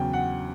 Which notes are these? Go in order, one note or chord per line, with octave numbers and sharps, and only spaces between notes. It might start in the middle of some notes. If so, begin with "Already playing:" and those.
Already playing: E2 C#3 F#3 G5
F#5